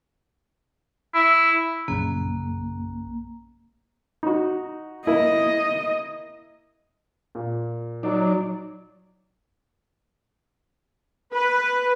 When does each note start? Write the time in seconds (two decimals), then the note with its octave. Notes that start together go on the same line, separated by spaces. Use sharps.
1.14 E4
1.88 A#1 F#2 C#3 A#3
4.23 D#4 F#4
5.07 A#3 E4 D#5
7.35 A#2
8.03 F#3 D#4 D5
11.34 B4